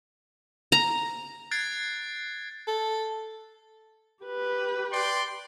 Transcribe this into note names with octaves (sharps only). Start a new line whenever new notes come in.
A#5
F#6 G#6 A6 C7 D7
A4
G4 B4
D5 G5 C6